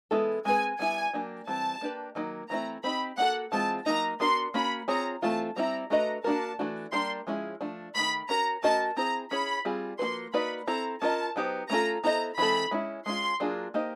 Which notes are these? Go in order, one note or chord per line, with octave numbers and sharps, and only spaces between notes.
E3 G#3 B3 E4 A4
G#3 C4 E4 G#4 B4 G#5
G3 B3 E4 G#5
F#3 A#3 D4 G4
E3 G3 C4 A5
A#3 D4 G4 B4
D#3 F#3 A#3 D#4
E3 A3 C4 E4 A#5
C4 D#4 G4 B5
A#3 D4 F#4 A4 F#5
E3 G#3 C4 F4 A5
F#3 A#3 D#4 A#5
B3 D4 F#4 A#4 C6
A#3 C#4 F#4 B5
C4 F4 G#4 C#5 A#5
E3 A3 C4 F4 A5
G3 C4 E4 A#5
A3 D4 F#4 B4 D#5 A#5
A#3 D4 F#4 A#4 A5
E3 A3 D4 F#4
G3 A#3 D4 G4 A#4 C6
F3 G#3 C#4 E4 G#4
F3 A3 D4
D#3 F#3 A3 B5
C#4 F#4 A#4 A#5
A3 C#4 F#4 A#4 D#5 A5
C4 E4 G#4 C5 A#5
C#4 E4 G#4 C#5 B5
G3 C4 F4 G#4
F3 A#3 D4 F#4 B4 C6
A#3 D#4 F#4 B4 D5 B5
C4 E4 A4 A#5
C#4 F4 A#4 D#5 A5
F#3 B3 D#4 G4 C5
A3 C#4 F4 A4 A#5
B3 E4 A4 C5 D#5 A#5
E3 G#3 C4 E4 A4 B5
G#3 C#4 E4
G#3 C#4 F4 C6
F#3 A#3 D4 F4 G#4
A#3 D#4 G4 C5 D#5